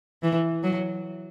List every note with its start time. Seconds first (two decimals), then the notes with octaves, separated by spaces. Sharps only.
0.23 E3
0.63 F#3